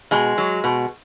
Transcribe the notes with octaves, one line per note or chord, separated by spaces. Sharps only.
B2 G#3
F#3
B2